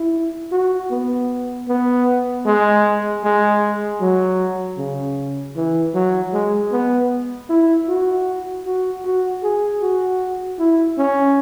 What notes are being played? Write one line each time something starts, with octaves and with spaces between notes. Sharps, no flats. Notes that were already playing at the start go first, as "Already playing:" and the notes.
Already playing: E4
F#4
B3
B3
G#3
G#3
F#3
C#3
E3
F#3
G#3
B3
E4
F#4
F#4
F#4
G#4
F#4
E4
C#4